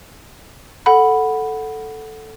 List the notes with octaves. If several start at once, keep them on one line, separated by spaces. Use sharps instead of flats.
A4 F#5 B5